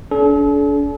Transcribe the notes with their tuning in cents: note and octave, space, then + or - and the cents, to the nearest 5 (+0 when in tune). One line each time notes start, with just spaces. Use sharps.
D4 -40 A4 -45